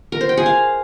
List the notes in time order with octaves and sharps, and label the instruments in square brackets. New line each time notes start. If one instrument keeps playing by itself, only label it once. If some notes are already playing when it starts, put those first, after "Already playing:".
[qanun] A#4
C5
G5
G#4
F5